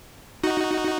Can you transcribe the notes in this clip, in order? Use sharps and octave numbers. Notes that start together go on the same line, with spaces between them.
D#4 F#4